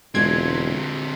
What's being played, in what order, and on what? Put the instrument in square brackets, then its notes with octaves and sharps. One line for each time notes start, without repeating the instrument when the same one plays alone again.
[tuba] E1 [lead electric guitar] D3 C4 [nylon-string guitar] G#3 D4 F4 [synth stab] G#6